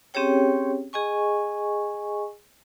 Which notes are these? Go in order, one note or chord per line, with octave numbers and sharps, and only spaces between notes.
C4 C#4 G4 G#4 C#5 G5
G#4 D#5 G#5 C#6